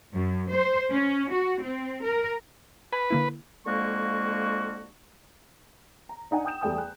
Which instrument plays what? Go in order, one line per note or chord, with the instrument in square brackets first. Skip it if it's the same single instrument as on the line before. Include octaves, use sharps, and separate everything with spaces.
[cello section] F#2
C5
C#4
F#4
C4
A#4
[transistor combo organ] B4 [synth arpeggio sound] G#5 B5
[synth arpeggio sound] D3 A#3 E4
[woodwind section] F2 D3 G#3 A#3 F#4 C#6
[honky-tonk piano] A#5
D4 D#4 F#5 G#5
G5 D#6 G6 E7
E2 G3 A3 G5 G#5 D#6
F#6